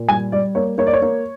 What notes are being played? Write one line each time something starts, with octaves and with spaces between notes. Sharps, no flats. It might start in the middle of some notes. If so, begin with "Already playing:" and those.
Already playing: A#2
G3 G#5
G3 D5
A#3 C#5
A#3 C#5
D5
C#5
A#3